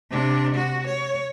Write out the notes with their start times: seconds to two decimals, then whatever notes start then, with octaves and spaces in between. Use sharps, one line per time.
0.10 C3 D4
0.55 F#4
0.87 C#5